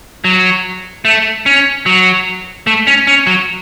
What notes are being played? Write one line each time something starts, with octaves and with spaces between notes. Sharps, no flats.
F#3
A3
C#4
F#3
A3
C#4
C#4
F#3